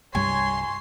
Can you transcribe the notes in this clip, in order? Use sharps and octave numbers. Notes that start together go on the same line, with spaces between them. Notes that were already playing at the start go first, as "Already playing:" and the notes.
C2 G2 G3 C#5 G#5 C6